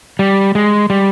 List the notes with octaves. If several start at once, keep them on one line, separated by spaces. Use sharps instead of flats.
G3
G#3
G3